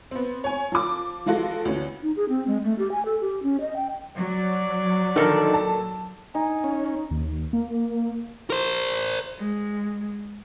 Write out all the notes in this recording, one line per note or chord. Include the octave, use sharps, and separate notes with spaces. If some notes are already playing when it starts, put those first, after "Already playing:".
B3 C4
C#5 G#5
F3 D6
E3 F3 G#3 F4 F#4 A4
D2 E3 C#4
D#4
G#4
C4
G#3
A3
G4
G#5
A4
G4
C#4
D#5
G5
F#3 D5
A#2 D3 D#3 A4 A#4
A5
D#4 G#5
C#4
D#2
A#3
A#4 C5
G#3